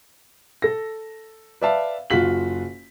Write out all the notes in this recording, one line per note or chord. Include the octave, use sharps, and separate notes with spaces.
A4 A#6
B4 D5 E5 F5 A5
F#1 F4 F#4 B6 F#7